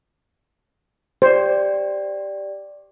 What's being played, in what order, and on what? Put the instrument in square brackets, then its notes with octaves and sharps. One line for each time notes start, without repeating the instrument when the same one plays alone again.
[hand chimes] G4 D5 [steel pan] C5